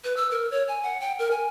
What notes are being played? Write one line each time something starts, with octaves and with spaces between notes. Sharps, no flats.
B4
E6
A#4
C#5
G#5
F#5
G5
A#4
G#5